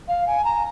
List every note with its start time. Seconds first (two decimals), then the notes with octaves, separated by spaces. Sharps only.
0.08 F5
0.27 G#5
0.44 A#5